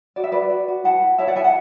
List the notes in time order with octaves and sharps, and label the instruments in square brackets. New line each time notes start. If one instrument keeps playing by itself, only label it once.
[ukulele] F#4 D5
E5
F#4 B4 D5
F#4
F#4
E4 F#5 A5
E4
E4 C#5 E5
D5 F#5
E4 E5 G#5
F#5 A5